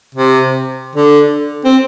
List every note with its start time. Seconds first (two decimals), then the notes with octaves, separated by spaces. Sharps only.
0.15 C3
0.96 D3
1.65 C4